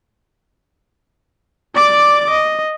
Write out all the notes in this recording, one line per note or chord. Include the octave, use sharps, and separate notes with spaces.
D5 D6
D#5